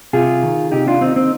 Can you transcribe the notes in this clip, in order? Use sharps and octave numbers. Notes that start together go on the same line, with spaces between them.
C3 F4 G#4
D#3
C3 D#4 G4
D4 F4
D#3 C4 D#4
C4 D#4